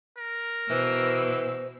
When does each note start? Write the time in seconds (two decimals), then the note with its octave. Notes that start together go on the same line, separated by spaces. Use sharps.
0.18 A#4
0.70 B2 E3 C5 E6